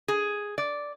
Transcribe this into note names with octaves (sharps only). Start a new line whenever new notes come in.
G#4
D5